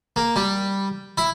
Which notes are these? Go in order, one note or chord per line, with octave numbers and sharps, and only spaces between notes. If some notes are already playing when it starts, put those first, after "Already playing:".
A#3
G3
E4